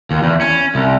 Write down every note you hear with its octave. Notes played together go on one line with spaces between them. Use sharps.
D#2
E2
C#4
C2